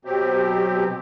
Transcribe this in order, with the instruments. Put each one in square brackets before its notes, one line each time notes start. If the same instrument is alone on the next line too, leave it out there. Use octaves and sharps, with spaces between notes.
[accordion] B2 F#3 C4 G4